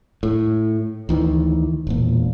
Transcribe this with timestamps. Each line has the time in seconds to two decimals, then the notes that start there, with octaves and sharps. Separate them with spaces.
0.23 A2
1.09 D2 D#3 E3
1.87 E1 A#2